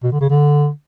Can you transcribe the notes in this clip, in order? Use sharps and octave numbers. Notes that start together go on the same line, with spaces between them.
B2
D3
C#3
D3